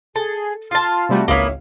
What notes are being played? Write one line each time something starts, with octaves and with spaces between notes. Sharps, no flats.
G#4 A4
F4 A5 C6 F6
C3 G3 A3 F#4
G#1 C#2 A#3 B3 E4 C#5 E5 F5